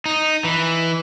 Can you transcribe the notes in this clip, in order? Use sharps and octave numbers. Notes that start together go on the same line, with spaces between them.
D#4
E3